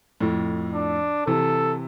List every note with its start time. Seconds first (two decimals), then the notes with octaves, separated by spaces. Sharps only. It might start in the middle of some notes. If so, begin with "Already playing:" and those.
0.20 F2 A2
0.74 D4
1.27 C3 E3 A4